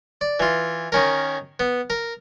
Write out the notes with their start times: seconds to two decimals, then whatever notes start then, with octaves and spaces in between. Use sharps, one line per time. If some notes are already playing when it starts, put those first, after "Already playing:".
0.21 D5
0.40 E3 F4
0.92 D#3 C#4 A#4
1.60 B3
1.90 A#4